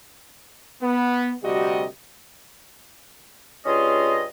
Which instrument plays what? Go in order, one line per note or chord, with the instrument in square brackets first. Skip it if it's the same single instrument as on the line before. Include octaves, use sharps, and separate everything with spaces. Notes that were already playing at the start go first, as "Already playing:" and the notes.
[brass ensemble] B3
D2 C3 G3 F#4 G4 D#5
[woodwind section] G2 C#4 F4 G#4 D#5